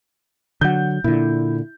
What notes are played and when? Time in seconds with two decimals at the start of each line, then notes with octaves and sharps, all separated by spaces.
0.61 D3 F#3 F#5 G6
1.04 A#2 D3 E4